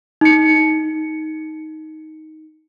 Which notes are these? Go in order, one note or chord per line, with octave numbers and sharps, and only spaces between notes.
D#4 C#7